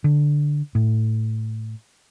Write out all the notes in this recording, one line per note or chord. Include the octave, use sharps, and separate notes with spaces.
D3
A2